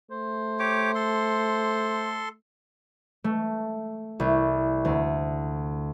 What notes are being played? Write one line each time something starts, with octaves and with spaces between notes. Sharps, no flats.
A3 C5
G4 C#5 D6
A4 C6
A3
C2
D2